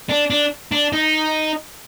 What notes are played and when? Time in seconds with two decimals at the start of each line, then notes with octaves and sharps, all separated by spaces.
0.09 D4
0.30 D4
0.72 D4
0.93 D#4